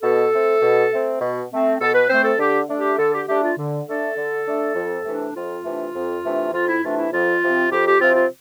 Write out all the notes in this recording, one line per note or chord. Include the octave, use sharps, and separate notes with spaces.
B2 A4
A3 C4
B2
A3 C4
B2
A3 C4
B2 A4
B4
A3 C4 C5
A4
D3 G4
A3 D4
G4
D3 A4
G4
A3 D4 G4
F4
D3
A3 D4 A4
D3
A3 D4
F2
C3 E3 A3 D4
F2 F4
C3 E3 A3 D4
F2
C3 E3 A3 D4
F2 F4
E4
C3 E3 A3 D4 F4
E4
F2 F4
C3 F3 C4
F2 G4
G4
C3 F3 C4 F4
F4